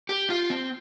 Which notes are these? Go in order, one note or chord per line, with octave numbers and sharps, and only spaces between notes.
G4
F4
C4